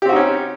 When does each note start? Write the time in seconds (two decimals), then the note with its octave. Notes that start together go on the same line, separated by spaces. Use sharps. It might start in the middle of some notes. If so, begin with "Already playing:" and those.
0.02 G4
0.05 C4
0.09 F#4
0.13 D#4
0.16 C#4